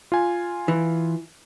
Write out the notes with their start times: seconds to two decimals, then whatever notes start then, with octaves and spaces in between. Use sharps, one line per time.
0.12 F4 G#5
0.68 E3